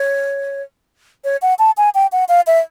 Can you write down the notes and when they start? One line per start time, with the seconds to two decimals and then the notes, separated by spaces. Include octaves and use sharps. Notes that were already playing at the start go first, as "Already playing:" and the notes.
Already playing: C#5
1.24 C#5
1.42 F#5
1.59 A5
1.77 G#5
1.94 G5
2.12 F#5
2.29 F5
2.47 E5